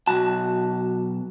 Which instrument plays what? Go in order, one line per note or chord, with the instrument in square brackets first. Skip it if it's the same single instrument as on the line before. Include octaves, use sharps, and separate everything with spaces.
[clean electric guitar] B1 A5 [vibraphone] F#4